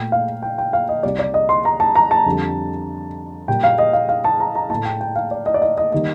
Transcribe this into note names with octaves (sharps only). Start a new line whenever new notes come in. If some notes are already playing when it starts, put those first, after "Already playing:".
Already playing: A#2 A3 G5
F5
G5
G5
F5
D#5
C2 C3 G3 D5
D5
D#5
C6
A#5
A5
A#5
A5
F2 D3 G3
A#2 G3 A#3 G5
F5
D#5
F5
F5
A5
A#5
A#5
A2 A3 A5
G5
G5
F5
D5
D#5
D5
D#5
D#5
D#3 G3 A#3 D#5